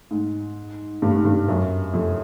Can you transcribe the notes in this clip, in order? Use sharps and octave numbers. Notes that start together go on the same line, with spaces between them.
G#2
G2
G#2
G2
F#2
F2